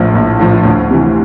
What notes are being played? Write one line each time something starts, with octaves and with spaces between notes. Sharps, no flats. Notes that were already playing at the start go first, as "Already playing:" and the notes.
Already playing: A#1 A2 F3
A#1
A2 F3
D2
C3 E3